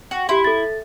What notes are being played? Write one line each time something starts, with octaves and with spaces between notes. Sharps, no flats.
F#4
E4 G4 C6
A4 A6